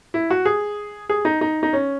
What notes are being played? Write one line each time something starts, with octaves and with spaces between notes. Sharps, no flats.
E4
F#4
G#4
G#4
D#4
D#4
D#4
C#4